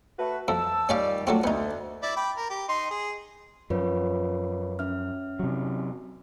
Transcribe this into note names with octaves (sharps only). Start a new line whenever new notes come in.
A3 F#4 B4
F2 A5 E6
A#2 D#3 G3 C#4 D5 F5
F#3 A3 C4 D4 F4 F#4
D2 B3 D#4
E4 D5
G5 B5 D6
A#4
G4
D#4 C6
G#4
F#2 F3 F4 B4 C#5
C#4 E5 F6
C3 F#3